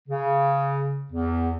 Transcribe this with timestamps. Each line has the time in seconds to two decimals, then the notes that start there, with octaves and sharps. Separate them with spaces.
0.08 C#3
1.11 E2